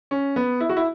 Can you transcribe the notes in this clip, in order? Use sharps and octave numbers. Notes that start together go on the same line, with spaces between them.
C#4
B3
E4
F#4
E4